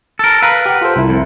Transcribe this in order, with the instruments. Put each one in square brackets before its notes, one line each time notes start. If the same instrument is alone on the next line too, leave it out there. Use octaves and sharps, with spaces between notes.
[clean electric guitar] A4 A#4
[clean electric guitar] A#4 B4 [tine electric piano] F5
[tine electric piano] G4 F#5
F4 A4 C5
C2 E4
[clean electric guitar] F2